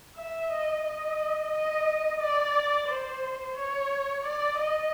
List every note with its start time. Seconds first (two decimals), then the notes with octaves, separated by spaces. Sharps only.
0.16 E5
0.51 D#5
0.85 D#5
1.52 D#5
2.20 D5
2.88 C5
3.56 C#5
4.23 D5
4.58 D#5